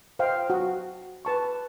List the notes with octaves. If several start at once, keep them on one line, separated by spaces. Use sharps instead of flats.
C5 D#5 F5 G5
F#4
B4 A5 C#6